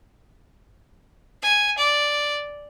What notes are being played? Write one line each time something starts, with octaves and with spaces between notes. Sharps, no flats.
G#5
D5